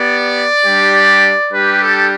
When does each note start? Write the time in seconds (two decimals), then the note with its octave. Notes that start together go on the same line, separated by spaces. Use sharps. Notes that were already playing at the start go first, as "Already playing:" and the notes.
Already playing: B3 G4 D5
0.65 G3 D4 G4
1.53 G3 D4 G4 B4
1.82 A4